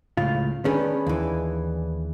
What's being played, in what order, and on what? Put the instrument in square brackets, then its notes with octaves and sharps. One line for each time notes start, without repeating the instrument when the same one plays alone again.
[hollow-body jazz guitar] C#2 A2 F4
[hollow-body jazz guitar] D#3 C#4 [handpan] D4 G#4 B4
[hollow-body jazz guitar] D#2 E3